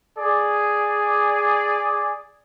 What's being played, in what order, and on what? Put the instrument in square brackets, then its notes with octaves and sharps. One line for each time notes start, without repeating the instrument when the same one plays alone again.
[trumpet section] G#4 D5